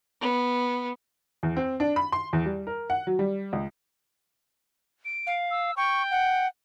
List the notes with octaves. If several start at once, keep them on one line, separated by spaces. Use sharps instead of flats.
B3
E2
C4
D4
B5
C6
E2
G3
A#4
F#5
F#3
G3
C#2
D7
F5
E6
G5 C#6
F#5